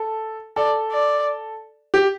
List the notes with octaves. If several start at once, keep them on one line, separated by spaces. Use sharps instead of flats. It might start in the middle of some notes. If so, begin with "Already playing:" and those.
Already playing: A4
A4 D5
D5
G4